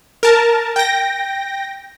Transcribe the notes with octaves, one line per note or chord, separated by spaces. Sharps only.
A#4 A5
G5 A#6